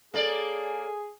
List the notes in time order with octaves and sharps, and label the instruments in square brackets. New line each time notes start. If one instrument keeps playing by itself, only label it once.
[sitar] A#3 D5 [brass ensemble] G#4 [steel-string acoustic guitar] A4 C#5